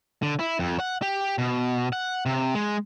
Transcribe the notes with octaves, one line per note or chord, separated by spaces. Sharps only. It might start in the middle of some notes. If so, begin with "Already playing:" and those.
D3
E4
F2
F#5
G4
B2
F#5
C3
G#3